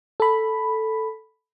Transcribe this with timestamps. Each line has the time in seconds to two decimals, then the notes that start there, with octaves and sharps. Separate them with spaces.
0.20 A4 B5